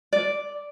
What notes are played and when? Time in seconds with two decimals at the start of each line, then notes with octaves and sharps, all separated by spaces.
0.13 D5